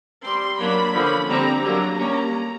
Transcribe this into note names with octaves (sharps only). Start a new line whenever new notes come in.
G3 C4 C6
F#3 A#3 D4 B5
D3 F3 A#3 C#4
D3 G3 C4 A#5
D3 F#3 A#3 A#5
G3 A#3 C#4